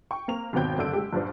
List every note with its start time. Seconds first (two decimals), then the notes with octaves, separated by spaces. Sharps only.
0.11 G5 C#6
0.28 A#3 C4 F7
0.53 G#1 D#2 B2 C4 G5 G6
0.77 F#1 D3 D5 E6 D7
0.93 G#3 G4
1.13 A#1 G2 F3 D4 C5